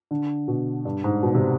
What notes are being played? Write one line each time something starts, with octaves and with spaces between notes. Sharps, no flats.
D3
B2
G2
G#2
B2
C3